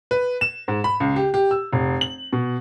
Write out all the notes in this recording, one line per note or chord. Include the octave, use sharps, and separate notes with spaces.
B4
E7
G#2
B5
C#2
G4
G4
E6
F1
F#7
B2